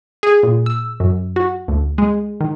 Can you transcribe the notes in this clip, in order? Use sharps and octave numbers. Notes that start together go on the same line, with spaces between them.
G#4
A#2
E6
F#2
F#4
D2
G#3
D#3